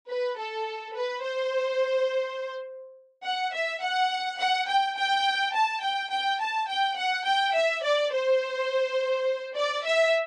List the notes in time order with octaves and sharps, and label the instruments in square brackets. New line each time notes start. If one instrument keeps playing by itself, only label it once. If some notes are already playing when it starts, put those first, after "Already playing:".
[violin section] B4
A4
B4
C5
F#5
E5
F#5
F#5
G5
G5
A5
G5
G5
A5
G5
F#5
G5
E5
D5
C5
D5
E5